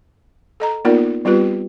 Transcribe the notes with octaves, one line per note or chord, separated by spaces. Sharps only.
A4 D#5 A#5
A#3 B3 D#4 F4 A#4 D5
G3 B3 C4 F4 G4 B4